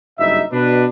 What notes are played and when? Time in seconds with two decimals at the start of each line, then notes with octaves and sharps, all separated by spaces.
0.18 F#1 G2 G3 D#4 E4 E5
0.52 B2 D4 B4